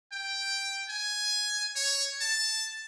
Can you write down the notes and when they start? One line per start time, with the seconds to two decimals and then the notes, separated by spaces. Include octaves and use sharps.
0.12 G5
0.89 G#5
1.76 C#5
2.21 A5